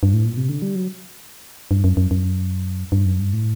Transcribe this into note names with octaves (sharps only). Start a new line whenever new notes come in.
G2
A2
A#2
C3
D3
G3
F#3
G2
F#2
F#2
F#2
G2
F#2
G2
A2